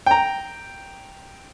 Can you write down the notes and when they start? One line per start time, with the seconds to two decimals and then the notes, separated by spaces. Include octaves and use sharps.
0.06 G5 A#5